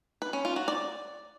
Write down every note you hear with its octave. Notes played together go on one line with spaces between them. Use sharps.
B4
C#4
F4
F#4
D5